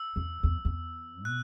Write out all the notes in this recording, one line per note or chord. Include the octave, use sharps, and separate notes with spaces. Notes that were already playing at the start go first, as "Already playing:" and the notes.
Already playing: E6
E2
E2
E2
B2 F#6